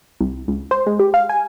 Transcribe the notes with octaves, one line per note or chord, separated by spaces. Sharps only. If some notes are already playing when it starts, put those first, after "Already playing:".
C2
C#2
C5
G#3
G4
F5
G#5